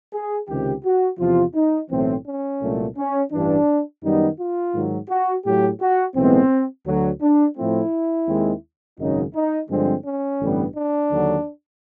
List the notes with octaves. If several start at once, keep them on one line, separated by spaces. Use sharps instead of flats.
G#4
C#2 C3 D#3 G4
F#4
E2 C3 F3 F4
D#4
B1 A2 E3 A3 C4
C#4
C2 A#2 F#3 A3
C#4
A1 G2 E3 D4
F#2 D#3 G3 B3 D#4
F4
G#2 D#3 F#3
F#4
A2 F#3 A3 G4
F#4
B1 A2 E3 G#3 B3 C4
D2 D3 F#3
D4
A2 F3 A3 C4 E4
D#2 D#3 G#3 C4
G#1 F#2 C#3 F#3 D#4
D#4
G2 D3 F3 G#3 C4
C#4
A1 G2 D3 G3 B3
D4
D#2 D3 F#3